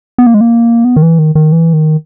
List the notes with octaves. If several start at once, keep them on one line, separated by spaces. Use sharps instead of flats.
B3
A#3
G#3
A#3
B3
D#3
E3
D#3
D#3
E3
D#3